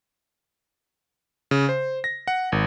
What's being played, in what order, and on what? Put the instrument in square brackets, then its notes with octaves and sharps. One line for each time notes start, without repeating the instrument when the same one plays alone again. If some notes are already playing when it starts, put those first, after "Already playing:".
[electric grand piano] C#3
C5
A#6
F#5
G#1